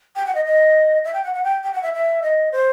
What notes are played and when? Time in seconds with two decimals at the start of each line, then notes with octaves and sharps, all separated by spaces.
0.16 G5
0.26 F#5
0.35 D#5
0.45 D#5
1.05 E5
1.14 G5
1.24 F#5
1.34 F#5
1.44 G5
1.63 G5
1.73 F#5
1.83 E5
1.94 E5
2.22 D#5
2.52 C5